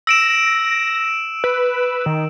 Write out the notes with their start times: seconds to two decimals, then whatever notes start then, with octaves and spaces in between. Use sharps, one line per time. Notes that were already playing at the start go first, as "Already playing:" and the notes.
0.07 E6 A#6 D7 E7
1.44 B4
2.06 D#3